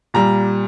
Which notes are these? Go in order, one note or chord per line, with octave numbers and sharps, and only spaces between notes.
A#2 G3 A#5